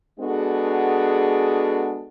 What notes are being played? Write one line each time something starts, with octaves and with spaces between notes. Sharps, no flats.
G#3 B3 D4 F#4 G#4 A4